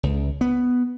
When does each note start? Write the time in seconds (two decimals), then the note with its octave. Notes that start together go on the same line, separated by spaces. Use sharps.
0.03 C#2
0.41 B3